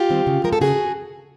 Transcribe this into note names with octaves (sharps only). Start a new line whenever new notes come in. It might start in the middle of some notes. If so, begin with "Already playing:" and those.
Already playing: F4 G4
D#3 G3 C4
C#3
F3 G#3 A#4
A4
C#3 F#4 G#4